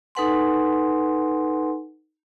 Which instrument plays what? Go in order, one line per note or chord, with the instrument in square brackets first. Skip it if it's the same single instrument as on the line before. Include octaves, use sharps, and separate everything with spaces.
[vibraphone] D#4 A4 B4 F#5 G#5 C6